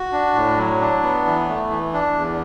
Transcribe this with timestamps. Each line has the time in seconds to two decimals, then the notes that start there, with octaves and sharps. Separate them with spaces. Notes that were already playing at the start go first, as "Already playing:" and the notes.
Already playing: F#4
0.12 D4
0.35 A2
0.57 F#3
0.81 D4
1.03 B3
1.26 E3
1.49 A3
1.70 E3
1.93 D4
2.16 E2